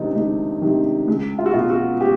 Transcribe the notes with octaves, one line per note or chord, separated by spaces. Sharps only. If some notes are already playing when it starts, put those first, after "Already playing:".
Already playing: C#2 C3 D#3 C4 D4 D#4
C#2 D#4
C3 D#3
C#2
F4
F#4
B2 F4
F#4
G4